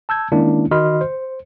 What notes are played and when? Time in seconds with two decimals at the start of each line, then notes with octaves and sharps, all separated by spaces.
0.09 A5 E6 G6 G#6
0.32 D#3 G#3 A#3 C#4 D4 E4
0.71 D#3 F#4 D#5 B5 C6 F6
1.01 C5